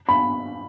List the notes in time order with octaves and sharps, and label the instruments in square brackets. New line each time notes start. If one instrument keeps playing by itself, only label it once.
[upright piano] B5